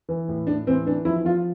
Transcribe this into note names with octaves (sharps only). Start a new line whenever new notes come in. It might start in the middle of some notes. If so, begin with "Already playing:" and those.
E3
A2
A2 D4
E3 C4
E3 D4
F3 E4
F3 F4